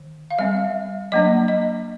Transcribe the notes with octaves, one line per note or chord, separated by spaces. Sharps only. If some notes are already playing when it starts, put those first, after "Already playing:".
Already playing: D#3
F5
G3 C4 E5
F#3 A#3 D4 D#5
D#5